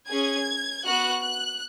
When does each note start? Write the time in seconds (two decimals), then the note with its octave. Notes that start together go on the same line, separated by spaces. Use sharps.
0.09 C#4 G#4 G#6
0.84 B3 F#4 F#6
1.22 F#6